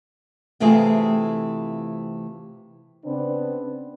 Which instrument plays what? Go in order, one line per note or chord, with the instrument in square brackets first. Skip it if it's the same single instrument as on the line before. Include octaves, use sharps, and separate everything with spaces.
[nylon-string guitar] C3 E3 A3 C4 F4 G#4
[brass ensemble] C#3 B3 C4 D4